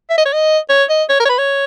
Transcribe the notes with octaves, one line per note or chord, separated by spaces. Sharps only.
E5
D#5
C#5
D#5
C#5
D#5
C#5
A#4
C#5
B4
C#5